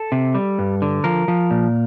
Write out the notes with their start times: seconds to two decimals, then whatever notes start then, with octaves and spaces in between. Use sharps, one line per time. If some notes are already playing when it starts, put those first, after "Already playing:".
Already playing: A4
0.12 C3
0.34 G3
0.59 G2
0.82 D3
1.04 F3 A#4
1.28 F3
1.51 A#2